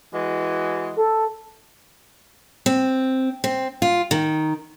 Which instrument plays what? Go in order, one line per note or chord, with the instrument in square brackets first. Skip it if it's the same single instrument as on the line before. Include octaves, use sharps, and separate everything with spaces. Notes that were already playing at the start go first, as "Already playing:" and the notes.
[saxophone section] E3 G#3 F#4
[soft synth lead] A4
[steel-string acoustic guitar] C4
C4
F4
D#3